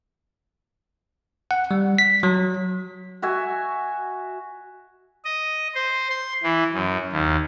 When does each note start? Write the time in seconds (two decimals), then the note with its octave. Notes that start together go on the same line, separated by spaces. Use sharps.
1.51 F#5
1.71 G3
1.98 B6
2.23 F#3
3.22 F#4 E5 G#5
5.25 D#5
5.75 C5
6.10 C6
6.43 E3
6.73 F#2
7.12 D#2